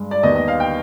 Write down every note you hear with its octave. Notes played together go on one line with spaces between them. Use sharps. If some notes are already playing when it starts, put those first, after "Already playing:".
Already playing: G2 G#3
D5
D#2 D#3 G3 B3 D#5
D#5
F5
G5